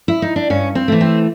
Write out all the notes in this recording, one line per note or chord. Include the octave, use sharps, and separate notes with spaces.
E4
D#4
D4
G2 C#4
C4
E3 A3
C4